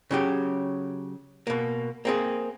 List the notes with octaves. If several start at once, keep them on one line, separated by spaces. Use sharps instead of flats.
C#3 F#3 G4
B2 A#3
A#3 C4 G#4